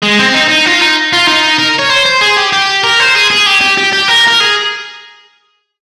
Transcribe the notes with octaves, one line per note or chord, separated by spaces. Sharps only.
G#3
C4
D#4
D#4
F4
D#4
F4
D#4
A#4
C#5
C5
C5
G#4
G4
G4
A#4
C5
G#4
G#4
G4
G4
G4
G4
A#4
A#4
G#4